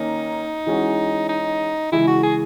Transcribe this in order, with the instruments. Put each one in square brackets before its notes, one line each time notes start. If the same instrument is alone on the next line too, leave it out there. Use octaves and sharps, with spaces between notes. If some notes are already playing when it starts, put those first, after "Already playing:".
Already playing: [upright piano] D#3 A#3 C#4 [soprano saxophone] D#4
[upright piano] E3 G#3 C#4 F#4
[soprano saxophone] D#4
[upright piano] C#3 E3 G#3 [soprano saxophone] E4
[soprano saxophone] F#4
G#4